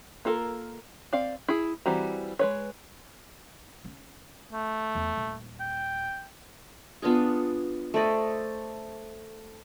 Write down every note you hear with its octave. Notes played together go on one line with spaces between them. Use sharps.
A#3 F4 A4 A#4
C4 D5 F5
E4 G#4
E3 G3 C4 F#4 A#5
G#3 B4 C#5
C#4
A3
E2
D#1
G5
B3 D4 F4 G#4
A3 C5 D5 D#5